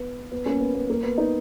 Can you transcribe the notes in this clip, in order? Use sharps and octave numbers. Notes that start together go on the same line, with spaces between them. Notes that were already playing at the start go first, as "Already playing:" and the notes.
Already playing: B3
B3
A#3 C#4
B3
B3
A#3
B3
B3 D#4